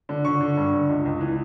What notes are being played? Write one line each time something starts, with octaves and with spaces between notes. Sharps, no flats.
D3
D3 C#6
D3
G2
D3
C#2
C#2
E3